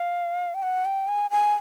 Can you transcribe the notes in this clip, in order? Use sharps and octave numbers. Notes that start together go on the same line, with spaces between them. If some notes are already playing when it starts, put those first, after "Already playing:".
Already playing: F5
G5
F#5
G5
G#5
G#5